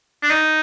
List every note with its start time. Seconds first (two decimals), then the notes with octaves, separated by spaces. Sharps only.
0.23 D4
0.30 D#4